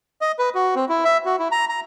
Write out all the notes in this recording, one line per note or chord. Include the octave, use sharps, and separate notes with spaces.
D#5
B4
F#4
C4
E4
E5
F#4
E4
A#5
A#5